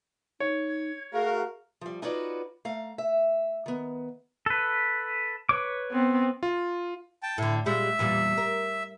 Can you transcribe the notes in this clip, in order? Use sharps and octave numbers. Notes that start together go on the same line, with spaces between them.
D#4 C#5
G#6
A3 F#4 G#4 A#4 F5
F3 G3
D#4 F4 F#4 B4 C#5 D5
A3 F5 A#5
E5
D#3 B3
A4 B4
B4 C#5 D6
B3 C4
F4
G5 A5
A2 D3 E4
A#2 G3 G#3 E5
E2 A#2 G3
A#4